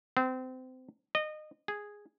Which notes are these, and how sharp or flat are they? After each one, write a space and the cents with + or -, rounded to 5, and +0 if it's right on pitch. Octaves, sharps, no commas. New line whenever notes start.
C4 -25
D#5 -25
G#4 -5